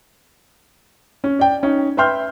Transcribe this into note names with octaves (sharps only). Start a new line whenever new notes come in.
C#4
D5 G5
C#4 D#4
B4 E5 G5 C6 F6 G6